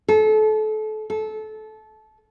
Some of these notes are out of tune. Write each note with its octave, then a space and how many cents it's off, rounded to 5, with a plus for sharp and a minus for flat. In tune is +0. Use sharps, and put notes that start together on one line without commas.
A4 -30
A4 -20